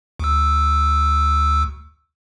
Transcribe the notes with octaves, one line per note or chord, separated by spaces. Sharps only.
D2 E6